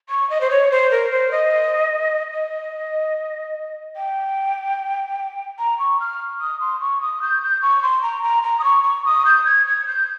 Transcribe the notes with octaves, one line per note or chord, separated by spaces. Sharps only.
C#6
D#5
C5
C#5
C5
A#4
C5
D#5
D#5
G5
A#5
C#6
F6
D#6
C6
C#6
D#6
G6
G6
C#6
C6
A#5
A#5
A#5
D#6
C#6
C#6
D#6
G6
G#6
G#6
G6